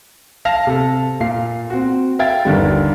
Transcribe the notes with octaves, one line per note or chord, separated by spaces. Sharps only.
F5 A5 A#6 F7
C3 A4
A#2 F5 C7
C4 F#4
E5 F5 G5 G#6 A6
G1 D#2 D3 G3